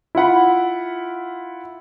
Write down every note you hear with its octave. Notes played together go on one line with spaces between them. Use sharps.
E4 F4 F#5 B5